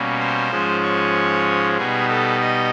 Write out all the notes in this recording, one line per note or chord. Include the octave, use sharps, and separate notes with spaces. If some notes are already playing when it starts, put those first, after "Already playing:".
Already playing: B2 G3 A#3 C#4
C5
G#2 F3 G#3 C#4
C#5
B2 G3 B3 D#4 G#4
A4
D#5